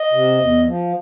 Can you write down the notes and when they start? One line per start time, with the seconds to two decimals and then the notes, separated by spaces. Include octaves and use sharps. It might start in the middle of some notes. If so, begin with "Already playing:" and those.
Already playing: D#5
0.13 C3
0.41 E2
0.67 F3